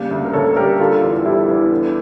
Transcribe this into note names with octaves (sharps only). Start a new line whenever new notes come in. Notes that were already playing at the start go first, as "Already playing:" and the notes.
Already playing: C#3 G3 A#3 D4
D2
A#4
D2 A4 C#5
G3 G4 A#4
D3 F4 A4
E2
G3 E4 G4
E2
D3